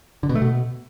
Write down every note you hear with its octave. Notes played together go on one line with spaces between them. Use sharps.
D3
B2
A3
B2